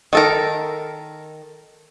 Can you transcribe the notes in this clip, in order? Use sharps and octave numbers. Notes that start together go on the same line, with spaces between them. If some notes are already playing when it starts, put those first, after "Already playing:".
D#3 A4 A#4